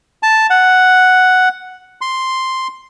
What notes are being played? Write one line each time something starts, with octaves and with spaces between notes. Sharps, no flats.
A5
F#5
C6